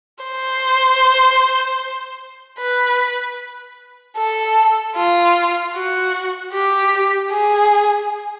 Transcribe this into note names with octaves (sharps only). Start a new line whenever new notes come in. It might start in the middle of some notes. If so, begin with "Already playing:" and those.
C5
B4
A4
F4
F#4
G4
G#4